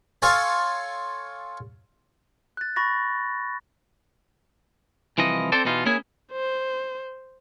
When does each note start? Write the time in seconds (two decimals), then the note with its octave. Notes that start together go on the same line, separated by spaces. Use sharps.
0.22 F4 A4 C#5 F5 G#5
2.57 F#6 A6
2.76 B5 C#6 A6 A#6
5.18 C2 E3 F3 D#5
5.52 C4 A4 C5 D5
5.66 B2 E3 D#4 F4
5.86 A#3 C#4 E4 G#4 G#5
6.32 C5